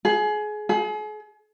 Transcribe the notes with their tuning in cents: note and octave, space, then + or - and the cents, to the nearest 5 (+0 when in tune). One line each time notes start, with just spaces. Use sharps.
G#4 +25
G#4 +40